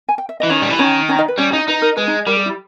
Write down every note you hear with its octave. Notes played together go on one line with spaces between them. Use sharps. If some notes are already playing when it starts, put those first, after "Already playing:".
G#5
G5
E5
E3 D#5
D#3 C#4 C#5
G3
E3
D#3 C#4 C#5
C#4 C#5
D#4 D#5
B4
G3 C#4 C#5
D#4
D#4 B4
A#4
G#3 B4
D#4
G3 A#4
G#4
E4